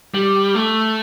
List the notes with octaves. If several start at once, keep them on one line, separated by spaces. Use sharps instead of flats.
G3
A3